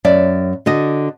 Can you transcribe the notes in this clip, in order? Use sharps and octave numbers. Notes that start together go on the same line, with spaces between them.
F#2 D5 E5
D3 F#4 D#5